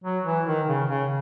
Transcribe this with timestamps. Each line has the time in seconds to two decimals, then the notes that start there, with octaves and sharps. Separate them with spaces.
0.04 F#3
0.25 E3
0.46 D#3
0.67 C#3
0.88 C#3